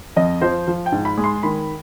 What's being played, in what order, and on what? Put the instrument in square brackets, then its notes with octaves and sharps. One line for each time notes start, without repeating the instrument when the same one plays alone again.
[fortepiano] F2 [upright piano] D#5
[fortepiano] F3 [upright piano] C5
[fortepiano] F3
[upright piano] G5
[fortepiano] G#2
[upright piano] B5
[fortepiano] G#3
[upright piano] C6
[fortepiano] D#3 [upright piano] B5